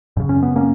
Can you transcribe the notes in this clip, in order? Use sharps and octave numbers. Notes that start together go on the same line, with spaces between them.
F#2 C#3
C#4
B3
A#3 C#4